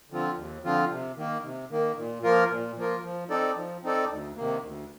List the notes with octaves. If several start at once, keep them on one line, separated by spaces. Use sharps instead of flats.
D3 F3 C4 F4
D#2
D3 F3 C4 F4
C3
D#3 A#3
C3
D#3 A#3
A#2
F3 A#3 F4 A#4
A#2
F3 A#3 F4 A#4
F3
C4 D#4 A4 D5
F3
C4 D#4 A4 D5
D2
C3 D#3 A#3
D2